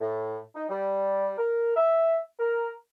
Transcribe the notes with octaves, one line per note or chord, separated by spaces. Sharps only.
A2
D#4
G3
A#4
E5
A#4